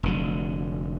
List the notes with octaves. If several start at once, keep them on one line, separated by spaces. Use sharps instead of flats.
F1 D3 F#3